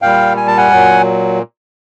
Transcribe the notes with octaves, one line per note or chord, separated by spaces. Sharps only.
A#2 G3 F5 G5
G#5
A5
F#5 G#5
A#2 F#3